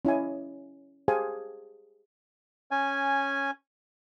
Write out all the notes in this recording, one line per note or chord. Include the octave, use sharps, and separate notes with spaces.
C#4 E4 D#5 G#5
G4 G#4 C5 F5 G#5 A5
C#4 G#5